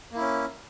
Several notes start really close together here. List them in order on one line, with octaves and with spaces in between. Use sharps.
A#3 E4 C#4